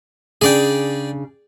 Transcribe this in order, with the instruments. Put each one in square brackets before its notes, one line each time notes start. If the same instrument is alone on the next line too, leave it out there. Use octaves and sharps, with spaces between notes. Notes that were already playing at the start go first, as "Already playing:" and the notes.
[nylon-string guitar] C#3 D4 [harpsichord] G#4 D5 G5